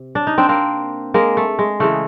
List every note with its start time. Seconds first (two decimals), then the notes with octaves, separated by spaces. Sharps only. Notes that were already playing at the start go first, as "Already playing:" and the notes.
Already playing: C3
0.15 D4
0.27 D#4
0.38 C4 D4
0.49 A#3 C4
1.14 G#3 A#3
1.37 A3
1.59 G#3
1.80 C#3 E3 G#3 A3